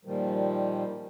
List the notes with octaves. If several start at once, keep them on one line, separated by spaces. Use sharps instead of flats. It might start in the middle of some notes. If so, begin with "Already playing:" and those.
A#2 D#3 F3 G3